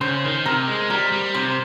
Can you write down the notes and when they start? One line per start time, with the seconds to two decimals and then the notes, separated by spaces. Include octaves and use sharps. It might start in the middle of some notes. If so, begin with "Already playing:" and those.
0.01 C#3 C5
0.24 D#3
0.46 C3 A#4
0.68 G#3
0.90 G3 A#4
1.12 G3
1.34 C3 C5